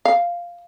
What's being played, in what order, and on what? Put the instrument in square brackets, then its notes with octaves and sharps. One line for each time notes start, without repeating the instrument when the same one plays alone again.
[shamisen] F5